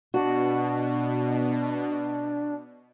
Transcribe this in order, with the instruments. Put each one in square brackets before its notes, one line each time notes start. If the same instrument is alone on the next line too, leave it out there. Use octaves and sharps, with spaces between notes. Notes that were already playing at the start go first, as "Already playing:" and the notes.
[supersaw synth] B2 [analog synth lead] D4 [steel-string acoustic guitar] F#4